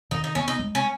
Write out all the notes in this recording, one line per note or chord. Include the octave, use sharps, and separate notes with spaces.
D#3 D#4
D#4
B3 C#4
D#4
G#3
C#4